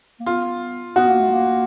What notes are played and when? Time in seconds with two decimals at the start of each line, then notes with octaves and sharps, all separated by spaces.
0.20 A#3
0.26 B3 F4
0.95 B3 F#4
1.07 A#3
1.20 A3
1.31 A#3